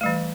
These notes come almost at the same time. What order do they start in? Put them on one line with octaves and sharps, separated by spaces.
A3 G3 E3